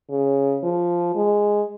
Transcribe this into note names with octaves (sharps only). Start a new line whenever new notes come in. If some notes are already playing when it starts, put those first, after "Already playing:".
C#3
F3
G#3